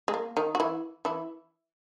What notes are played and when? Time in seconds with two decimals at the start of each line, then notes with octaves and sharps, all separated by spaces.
0.08 G#3
0.14 A#3
0.37 D#3 D#4
0.55 F#4
0.60 E3 E4
1.05 E3 E4